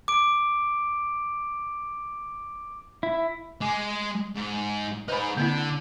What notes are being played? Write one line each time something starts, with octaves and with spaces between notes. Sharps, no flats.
D6 D7
E4
G#3 G#5 D6
G#2
D#4 G#4 B4 C5 B5
D3 A#3 C4 E4